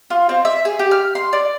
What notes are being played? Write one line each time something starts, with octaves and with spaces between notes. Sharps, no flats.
F4
C4
E5
G#4
G4
F6
C6
D5